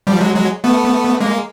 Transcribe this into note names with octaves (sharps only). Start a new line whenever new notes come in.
F3 G3
F#3 G#3
F#3 G#3
A3 B3
G#3 A#3